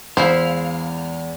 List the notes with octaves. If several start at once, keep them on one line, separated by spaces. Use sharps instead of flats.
E2 G#3 E4 C5 E5 F5